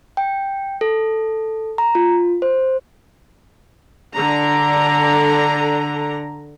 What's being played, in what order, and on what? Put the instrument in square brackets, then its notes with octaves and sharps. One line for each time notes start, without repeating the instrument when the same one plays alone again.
[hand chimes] G5
A4
A#5
F4
C5
[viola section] D3 D4 A#5